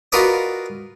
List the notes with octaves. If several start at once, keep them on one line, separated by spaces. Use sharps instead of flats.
F4 F#4 A#4 B4 D5 D#5